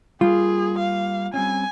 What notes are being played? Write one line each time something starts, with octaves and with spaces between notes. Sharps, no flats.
G3 A#3 F4 G#4
F5
G3 C4 C#4 G#5